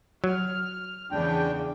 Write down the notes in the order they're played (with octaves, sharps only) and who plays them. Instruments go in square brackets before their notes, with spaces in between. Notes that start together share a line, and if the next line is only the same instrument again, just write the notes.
[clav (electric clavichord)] F#3 [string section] F6
[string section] E2 C#3 [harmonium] D4 G5